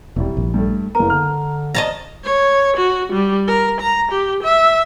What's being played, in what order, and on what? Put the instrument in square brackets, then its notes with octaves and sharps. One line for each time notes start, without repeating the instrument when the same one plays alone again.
[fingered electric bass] E1 [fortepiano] C2 G3
[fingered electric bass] A#1
[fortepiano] G2 A3
[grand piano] F#1 B3 [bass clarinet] A#4 [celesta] A#5
[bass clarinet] D3 [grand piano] F6
[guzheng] D#5 A5 A#5
[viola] C#5
F#4
G3
A#4
A#5
G4
E5